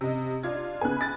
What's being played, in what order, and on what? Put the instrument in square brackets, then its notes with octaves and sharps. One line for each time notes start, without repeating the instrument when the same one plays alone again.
[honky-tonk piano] C3 D#5
D4 F4 G#6
[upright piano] C#3 B3 [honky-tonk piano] G#5 F#6
[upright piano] B5 A6